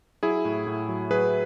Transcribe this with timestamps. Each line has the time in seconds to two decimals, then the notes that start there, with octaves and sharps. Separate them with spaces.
0.23 F#3 E4 G#4
0.45 A2
0.67 A2
0.89 F#3
1.10 F#3 G#4 B4